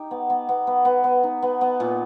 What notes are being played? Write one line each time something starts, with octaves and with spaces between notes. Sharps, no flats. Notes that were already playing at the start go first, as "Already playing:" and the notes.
Already playing: D#4 G4
B3
B3
B3
B3
B3
B3
D#4
B3
B3
A#2